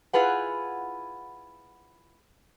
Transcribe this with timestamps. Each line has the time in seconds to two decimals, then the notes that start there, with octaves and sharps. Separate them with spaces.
0.13 E4 F4 G#4 B4 F#5